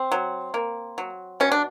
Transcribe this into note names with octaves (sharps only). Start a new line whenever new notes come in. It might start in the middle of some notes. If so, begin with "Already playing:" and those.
Already playing: C4
F#3
A#3
F#3
B2 C#4
D4